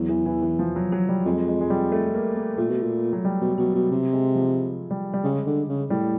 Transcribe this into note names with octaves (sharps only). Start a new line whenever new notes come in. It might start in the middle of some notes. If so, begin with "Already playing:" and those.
Already playing: E2 F#3
E3
E3
E3
F3
F#3
F#3
G3
F2 G#3
G#3
G#3
G3
A3
A#3
A#3
A#2 A3
B2
A#2
F#3
G3
B2
B2 F#3
B2
C3
G#3
F3
G3
G3
C#3 G#3
D3
C#3
A2 G3